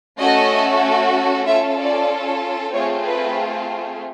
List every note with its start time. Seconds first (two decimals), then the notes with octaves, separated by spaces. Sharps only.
0.19 A3 C#4 F#4 A4 D#5
1.46 C#4 F4 A4 E5
1.78 D5
2.73 A3 C4 F4 G#4 C#5
3.04 B4